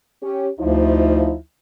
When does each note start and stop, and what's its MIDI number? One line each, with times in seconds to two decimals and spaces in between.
0.22 0.49 61
0.22 0.49 67
0.59 1.37 38
0.59 1.34 53
0.59 1.34 63
0.59 1.34 64